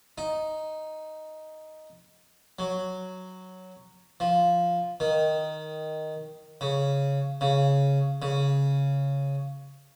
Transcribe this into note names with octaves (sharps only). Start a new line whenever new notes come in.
D#4
F#3
F3
D#3
C#3
C#3
C#3